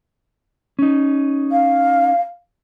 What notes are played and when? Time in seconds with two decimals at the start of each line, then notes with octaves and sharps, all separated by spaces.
0.79 C#4 D#4
1.51 F5